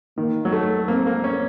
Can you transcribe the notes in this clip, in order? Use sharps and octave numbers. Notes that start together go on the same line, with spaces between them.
D#3 A#3
F#3
A3
A#3 C4
A#3
C#4